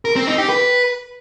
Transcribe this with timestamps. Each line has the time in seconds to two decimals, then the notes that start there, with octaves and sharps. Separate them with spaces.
0.05 A#4
0.16 C4
0.27 D#4
0.38 G4
0.49 B4